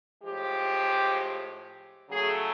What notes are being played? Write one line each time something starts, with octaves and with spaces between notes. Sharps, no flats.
A2 F3 G#3 G4
C#3 F#3 A3 G#4